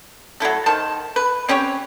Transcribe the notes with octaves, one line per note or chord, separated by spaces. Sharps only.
F#3 A3 E4 A4
D#3 C5 A5
B4
C4 C#4 G4 C#5